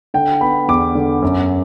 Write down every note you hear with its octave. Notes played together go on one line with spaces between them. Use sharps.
D3 G5
B3 B5
E2 D6
D3
F#2